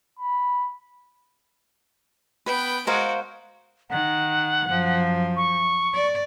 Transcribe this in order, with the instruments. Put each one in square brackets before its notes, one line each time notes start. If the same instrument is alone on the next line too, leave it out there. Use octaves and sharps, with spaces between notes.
[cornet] B5
[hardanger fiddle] B3 G5 [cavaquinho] B4
[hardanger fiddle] G#3 F#4 [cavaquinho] A#4 C5 F5
[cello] D#3 [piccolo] F#5
[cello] F#2 F3
[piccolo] C#6
[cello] D5